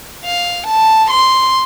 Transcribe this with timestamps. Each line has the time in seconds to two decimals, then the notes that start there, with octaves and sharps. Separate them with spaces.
0.25 F5
0.67 A5
1.10 C6